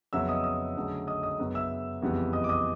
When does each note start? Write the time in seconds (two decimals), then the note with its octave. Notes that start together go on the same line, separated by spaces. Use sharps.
0.13 F2 C#3 F#3 B3 E5 E6
0.29 D#5 D#6
0.44 D#5 D#6
0.76 D2 C#3 F#3 A3
1.07 D#5 D#6
1.23 D#5 D#6
1.39 F#2 C#3 F#3 B3
1.55 E5 E6
2.02 F2 C#3 E3 G3 B3
2.33 D#5 D#6
2.44 D6
2.49 D#5 D#6